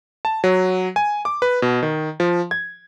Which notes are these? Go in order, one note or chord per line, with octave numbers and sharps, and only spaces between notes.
A5
F#3
G#5
D6
B4
B2
D#3
F3
G#6